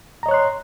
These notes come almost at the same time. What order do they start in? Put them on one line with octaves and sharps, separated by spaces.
A#5 D#5 C#5 F#6 C6